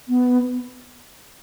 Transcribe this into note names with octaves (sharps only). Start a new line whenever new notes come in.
B3